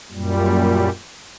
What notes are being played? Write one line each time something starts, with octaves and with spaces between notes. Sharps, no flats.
F#2 A#2 G3